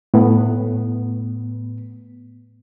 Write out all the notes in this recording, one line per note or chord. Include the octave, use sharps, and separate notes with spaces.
A2 B3